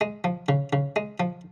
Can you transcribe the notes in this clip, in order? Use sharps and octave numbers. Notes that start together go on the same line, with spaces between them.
G#3
F3
C#3
C#3
G#3
F3